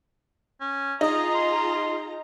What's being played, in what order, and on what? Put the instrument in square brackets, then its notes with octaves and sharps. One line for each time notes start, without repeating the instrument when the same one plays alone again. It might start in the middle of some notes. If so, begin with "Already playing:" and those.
[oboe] C#4
[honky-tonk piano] D#4 [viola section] F4 G#4 A#5 [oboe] D#5
[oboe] C6